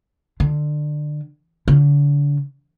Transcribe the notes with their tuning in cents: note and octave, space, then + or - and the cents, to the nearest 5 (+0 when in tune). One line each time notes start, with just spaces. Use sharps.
D3 +25
D3 -35